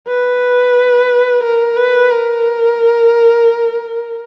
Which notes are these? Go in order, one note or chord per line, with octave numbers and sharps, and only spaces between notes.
B4
A#4
B4
A#4